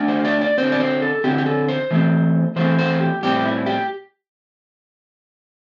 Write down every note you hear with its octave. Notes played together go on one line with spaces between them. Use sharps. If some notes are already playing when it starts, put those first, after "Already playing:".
Already playing: D3 A3 D4
C5
D5
D5
D3 C4 C5
D5
C5
A4
D3 C4 G4
E4
G4
A4
C5
E3 A3 C4
E3 A3 C4 C5
C5
G4
A2 G3 C4 G4
E4
G4